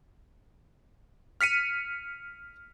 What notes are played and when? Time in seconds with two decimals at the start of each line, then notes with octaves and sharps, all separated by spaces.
1.41 F6 B6 C#7 D#7